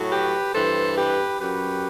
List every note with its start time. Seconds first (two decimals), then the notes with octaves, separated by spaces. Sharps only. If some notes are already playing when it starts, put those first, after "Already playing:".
Already playing: A2 F#3
0.10 G4 B4
0.53 G2 E3 A4 C5
0.97 G4 B4
1.40 F#2 F#3 G4 B4